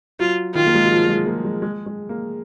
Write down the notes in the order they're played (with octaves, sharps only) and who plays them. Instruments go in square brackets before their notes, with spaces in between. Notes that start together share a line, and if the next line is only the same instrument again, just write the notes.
[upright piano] F#3 [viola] F4
[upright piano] D#3 [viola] F4
[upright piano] A#3
G#3
F#3
F3
G#3
A#3
G#3
G#3
G#3
A#3